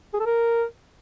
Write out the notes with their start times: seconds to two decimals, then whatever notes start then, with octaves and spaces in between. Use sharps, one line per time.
0.14 G#4
0.20 A4
0.26 A#4